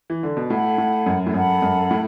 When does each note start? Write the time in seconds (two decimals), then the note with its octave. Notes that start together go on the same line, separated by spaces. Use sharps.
0.10 E3
0.23 D3
0.37 B2
0.50 A2 A4 F#5 B5
0.78 A2
1.06 F#2
1.26 A2
1.34 F#2 A4 F#5 B5
1.62 F#2
1.91 A2